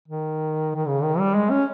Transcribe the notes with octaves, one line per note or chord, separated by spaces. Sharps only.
D#3
D#3
C#3
D#3
G3
G#3
C#4